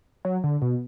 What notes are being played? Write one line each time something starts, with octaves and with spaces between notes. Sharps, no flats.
F#3
D3
B2